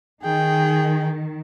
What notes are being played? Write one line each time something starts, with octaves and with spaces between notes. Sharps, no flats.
D#3 G#4 G5